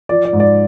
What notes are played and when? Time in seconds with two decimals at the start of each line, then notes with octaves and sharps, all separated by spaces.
0.09 F3 D5
0.25 D5
0.33 G#2
0.40 D5